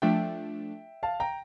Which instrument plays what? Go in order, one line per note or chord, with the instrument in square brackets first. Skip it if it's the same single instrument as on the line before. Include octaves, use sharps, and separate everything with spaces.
[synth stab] F3 A3 D4 [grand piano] E5 G5
[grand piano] F5 A5
G5 A#5